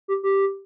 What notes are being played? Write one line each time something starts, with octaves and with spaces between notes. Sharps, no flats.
G4
G4